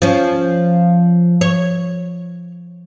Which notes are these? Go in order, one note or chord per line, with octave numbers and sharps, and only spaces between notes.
F3 C#4
C#5